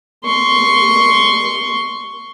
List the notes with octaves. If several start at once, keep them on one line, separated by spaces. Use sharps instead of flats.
C6 C#6